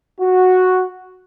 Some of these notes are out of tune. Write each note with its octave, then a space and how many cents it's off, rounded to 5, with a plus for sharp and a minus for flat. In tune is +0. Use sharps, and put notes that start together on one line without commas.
F#4 -5